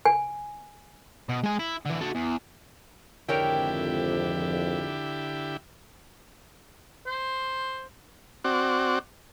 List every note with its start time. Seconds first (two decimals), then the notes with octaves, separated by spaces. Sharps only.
0.05 G#5
1.29 B2
1.44 G#3 G#5
1.59 E4
1.86 D3 E3
2.01 F#4 A4
2.15 E2
3.29 G#1 F2 D3 E4 G4 A#4 C#5 G5
7.06 C5
8.44 C4 F#4 D5